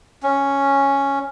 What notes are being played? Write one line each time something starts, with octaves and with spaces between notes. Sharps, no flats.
C#4